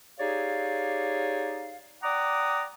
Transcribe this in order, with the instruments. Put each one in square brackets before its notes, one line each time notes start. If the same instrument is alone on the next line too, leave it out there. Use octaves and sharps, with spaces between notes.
[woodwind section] D#4 G4 G#4 C#5 D5 F5
D5 F#5 G5 A#5 D6 D#6